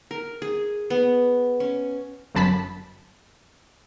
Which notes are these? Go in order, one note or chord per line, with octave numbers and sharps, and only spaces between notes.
A#4
G#4
B3
C#4
G1 F#2 A5 B5 B6